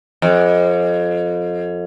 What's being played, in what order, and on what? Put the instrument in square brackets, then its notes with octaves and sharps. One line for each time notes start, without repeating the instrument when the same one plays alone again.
[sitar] F2